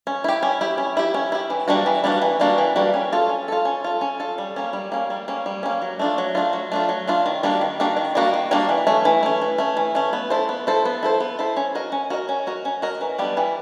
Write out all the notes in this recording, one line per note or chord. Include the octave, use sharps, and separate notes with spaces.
C#4
E4 G4
C#4
E4 G4
C#4
E4 G4
C#4
E4 G4
E3
G3 A#3 D4 F#4
E3
G3 A#3 D4 F#4
E3
G3 A#3 D4 F#4
E3
G3 A#3 D4 F#4
C#4
F4 A4
C#4
F4 A4
C#4
F4 A4
C#4
F4 A4
G3
A#3 C#4
G3
A#3 C#4
G3
A#3 C#4
G3
A#3 C#4
F#3
A3 D4 F4
F#3
A3 D4 F4
F#3
A3 D4 F4
F#3
A3 D4 F4
D#3
G3 A#3 D4 F#4
D#3
G3 A#3 D4 F#4
D#3
G3 A#3 D4 F#4
D#3
G3 A#3 D4 F#4
E3
A3 C#4
E3
A3 C#4
E3
A3 C#4
E3
A3 C#4
B3
E4 A4 C5
B3
E4 A4 C5
B3
E4 A4 C5
B3
E4 A4 C5
C#4
F#4 A#4 D#5
C#4
F#4 A#4 D#5
C#4
F#4 A#4 D#5
C#4
F#4 A#4 D#5
E3
G3 B3 D4 G4
E3